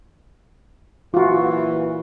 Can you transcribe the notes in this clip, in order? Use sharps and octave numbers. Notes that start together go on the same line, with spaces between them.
A#2 E3 F4 F#4